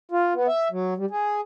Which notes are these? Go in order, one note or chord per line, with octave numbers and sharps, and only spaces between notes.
F4
B3
E5
F#3
G3
G#4